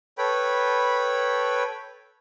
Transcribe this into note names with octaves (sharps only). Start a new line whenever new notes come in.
A4 B4 C#5 G5 B5